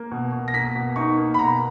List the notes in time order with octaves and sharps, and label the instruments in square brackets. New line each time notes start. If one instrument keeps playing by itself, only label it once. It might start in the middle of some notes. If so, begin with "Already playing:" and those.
Already playing: [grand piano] A#3
B2
B2
A#6
A#3 B6
B2
D#4 C#6
A#3
B5
B2 A#5